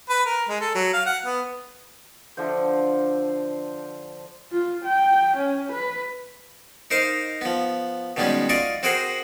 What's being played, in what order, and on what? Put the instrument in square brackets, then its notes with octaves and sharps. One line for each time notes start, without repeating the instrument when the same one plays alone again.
[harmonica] B4
A#4
G#3
A4
F#3
F5
F#5
B3
[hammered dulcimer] D3 F3 C5
[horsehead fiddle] F4
G5
C#4
B4
[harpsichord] D#4 A#4 C5 D#5 F5
F3 B3
B2 D#3 G3 G#3 B3 C#4
F4 D5 D#5 C#6
C4 F#4 G#4 A#4 C5 F#5